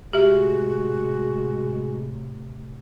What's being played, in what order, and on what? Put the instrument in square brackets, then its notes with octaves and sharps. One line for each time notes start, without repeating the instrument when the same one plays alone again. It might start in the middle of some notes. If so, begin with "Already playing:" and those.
[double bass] A2 C3 [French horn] G#3 [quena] F#4 [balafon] G4 E5